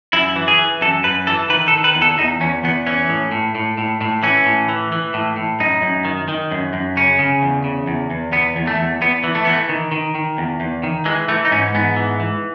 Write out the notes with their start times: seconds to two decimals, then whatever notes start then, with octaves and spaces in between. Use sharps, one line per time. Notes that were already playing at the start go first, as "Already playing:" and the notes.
0.13 F#2 E4
0.36 E3
0.48 G#4
0.59 E3
0.81 F#2 A4
1.04 F#2 B4
1.27 E3 A4
1.50 D#3 B4
1.68 A4
1.73 D#3
1.84 B4
1.95 E2
2.02 A4
2.18 E2 D#4
2.41 E2 C#4
2.64 E2 B3
2.86 E3 C#4
3.09 A2
3.32 A2
3.55 A2
3.78 A2
4.01 A2
4.23 E3 C#4
4.46 A2
4.69 E3
4.92 E3
5.14 A2
5.36 A2
5.60 F#2 D#4
5.82 F#2
6.05 D#3
6.28 D#3
6.51 F#2
6.73 F#2
6.97 C#3 C#4
7.19 C#3
7.42 E2
7.64 C#3
7.87 E2
8.10 E2
8.32 E2 B3
8.56 E2
8.67 A3
8.79 E2
9.01 E2 B3
9.24 E3
9.35 A3
9.45 E3 B3
9.53 A3
9.69 D#3
9.92 D#3
10.15 D#3
10.38 E2
10.60 E2
10.83 D#3
11.05 E3 G#3
11.28 E3 A3
11.45 D#4
11.52 G#2 C#4
11.75 G#2 B3
11.96 E3
12.20 E3